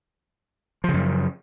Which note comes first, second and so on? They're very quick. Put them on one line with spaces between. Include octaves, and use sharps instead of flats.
F3 C#3 F#2